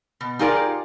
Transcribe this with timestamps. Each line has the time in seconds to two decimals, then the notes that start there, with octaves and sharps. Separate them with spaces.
0.21 B2
0.39 D#4 F4 G4 G#4 A#4 D5